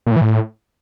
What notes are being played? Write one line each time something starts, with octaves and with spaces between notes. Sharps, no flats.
A#2
A2
E3
A2